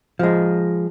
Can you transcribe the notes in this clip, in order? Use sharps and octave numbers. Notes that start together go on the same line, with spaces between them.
F3 G#3